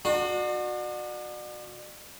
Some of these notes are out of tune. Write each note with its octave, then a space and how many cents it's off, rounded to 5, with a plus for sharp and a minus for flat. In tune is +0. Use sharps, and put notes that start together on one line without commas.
D4 +40 F#4 -25